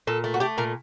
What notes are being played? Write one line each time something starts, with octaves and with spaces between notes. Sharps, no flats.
A#2 A4
A3
F#4
A3 G4
A#2 A#4